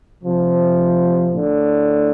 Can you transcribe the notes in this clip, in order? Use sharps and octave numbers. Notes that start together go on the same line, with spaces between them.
C3 F3
A2 D3